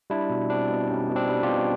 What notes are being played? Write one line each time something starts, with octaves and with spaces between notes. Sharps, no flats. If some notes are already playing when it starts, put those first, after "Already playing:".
G3 D4 E4
B2
G3 C4 D4
B2
G3 C#4
B2
C4 D4
G3
F4 G4
B2